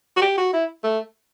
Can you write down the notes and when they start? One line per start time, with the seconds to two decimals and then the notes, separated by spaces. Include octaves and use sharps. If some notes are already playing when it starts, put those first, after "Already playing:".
0.17 F#4
0.22 G4
0.37 F#4
0.53 E4
0.84 A3